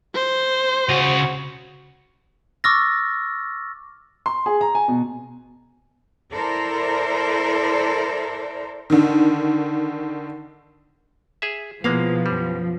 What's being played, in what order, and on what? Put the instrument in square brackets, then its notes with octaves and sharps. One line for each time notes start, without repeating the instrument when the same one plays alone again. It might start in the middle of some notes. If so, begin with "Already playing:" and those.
[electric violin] C5
[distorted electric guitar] C#3 D#5 [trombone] F#4
[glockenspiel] C#6 D6 E6 F6 A6 A#6
[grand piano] C6
G#4
A#5
G#5
B2
[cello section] E4 A4 A#4 C5 D5
[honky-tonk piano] D3 D#3
[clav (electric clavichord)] G#4 E5
[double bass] B2 E4 [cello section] F3 [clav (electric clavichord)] G#3 A#3 F5 [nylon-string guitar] B3
[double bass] F#2 [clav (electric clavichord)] G3